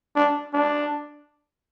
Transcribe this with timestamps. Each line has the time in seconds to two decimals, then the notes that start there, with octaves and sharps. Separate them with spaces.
0.16 D4
0.54 D4